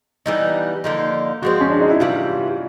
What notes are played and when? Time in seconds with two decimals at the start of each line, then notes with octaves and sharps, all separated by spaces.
0.26 E3 G3 B3 D#4
0.84 D3 F3 A#3 D#4
1.42 F3 G#3 C4 F#4
1.61 C#4
1.70 D4
1.80 D#4
1.90 E4
2.00 C3 E3 G3 F4